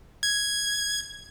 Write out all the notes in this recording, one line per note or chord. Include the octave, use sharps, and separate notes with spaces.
G#6